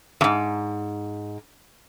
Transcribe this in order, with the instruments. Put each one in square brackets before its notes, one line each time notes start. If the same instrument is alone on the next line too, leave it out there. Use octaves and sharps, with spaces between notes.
[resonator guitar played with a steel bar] F2 G#2